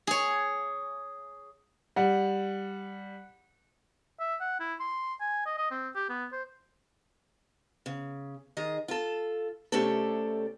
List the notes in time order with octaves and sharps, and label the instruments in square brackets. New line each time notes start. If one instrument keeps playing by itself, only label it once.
[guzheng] G#4 C#5
[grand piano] G3 [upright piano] F#5
[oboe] E5
F#5
E4
C6
G#5
D#5
D#5
C4
G4
B3
C5
[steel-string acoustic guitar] C#3
D#3 G#4 D#5
F4 A4
C3 A3 C#4 D4 G4 A4